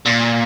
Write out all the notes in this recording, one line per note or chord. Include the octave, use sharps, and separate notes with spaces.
A#2